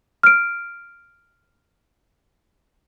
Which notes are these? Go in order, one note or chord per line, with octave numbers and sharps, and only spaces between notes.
F6 D7